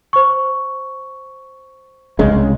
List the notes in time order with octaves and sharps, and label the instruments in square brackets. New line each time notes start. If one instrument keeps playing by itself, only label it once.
[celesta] C5 C#6
[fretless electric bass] C2 C#3 G#3